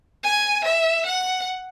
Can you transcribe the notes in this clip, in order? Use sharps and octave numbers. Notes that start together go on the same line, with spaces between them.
G#5
E5
F#5